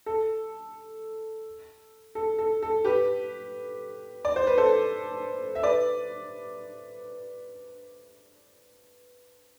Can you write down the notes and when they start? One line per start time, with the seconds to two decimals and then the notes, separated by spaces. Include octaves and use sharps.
0.06 A4
2.15 A4
2.39 A4
2.62 A4
2.85 G4 B4
4.25 D5
4.36 C5
4.47 B4
4.57 A4 C5
5.55 E5
5.63 B4 D5